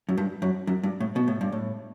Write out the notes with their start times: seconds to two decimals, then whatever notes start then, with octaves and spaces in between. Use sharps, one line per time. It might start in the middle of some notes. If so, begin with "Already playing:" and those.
0.09 F#2
0.18 G2
0.42 F#2
0.67 F#2
0.83 G2
1.00 A2
1.16 B2
1.28 A2
1.41 G2
1.52 A2